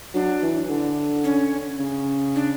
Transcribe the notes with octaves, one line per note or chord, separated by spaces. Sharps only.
F#3 D4
E3
D3
C#4
C#3
D4